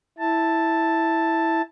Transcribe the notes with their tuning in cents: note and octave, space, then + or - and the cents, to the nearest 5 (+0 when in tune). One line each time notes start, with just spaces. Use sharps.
E4 -5 A5 +5